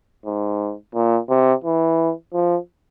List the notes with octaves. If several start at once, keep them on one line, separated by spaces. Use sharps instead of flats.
G#2
A#2
C3
E3
F3